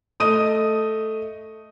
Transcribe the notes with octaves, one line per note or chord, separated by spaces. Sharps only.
A3 D#5 D#6 D#7